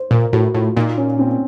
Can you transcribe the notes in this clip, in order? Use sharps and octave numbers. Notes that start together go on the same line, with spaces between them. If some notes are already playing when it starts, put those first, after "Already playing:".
Already playing: C5
A#2 A#4
A2 F#4
A2 F4
A#2 D#4
C#4
C4